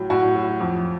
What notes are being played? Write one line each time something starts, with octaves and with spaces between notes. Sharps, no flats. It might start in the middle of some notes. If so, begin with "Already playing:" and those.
Already playing: A2 F#3
A2 F#4
F#3
F2